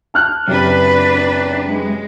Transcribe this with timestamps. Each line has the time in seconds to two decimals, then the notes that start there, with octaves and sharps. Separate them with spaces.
0.14 A5 F6 F#6
0.47 F#1 F#2 C3 D4 B4
1.68 G#3